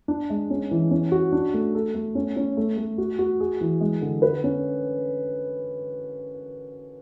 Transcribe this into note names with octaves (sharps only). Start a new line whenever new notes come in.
D4
G#3
C#4
E3
C#4
F#4
D4
A3
A4
A3
C#4
C#4
A3
A3
F#4
F#4
G#4
E3
G#3
D3
B4
C#4